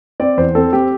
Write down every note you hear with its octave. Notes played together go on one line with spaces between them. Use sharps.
C4 D5
E2 C5
C4 A4
C4 G4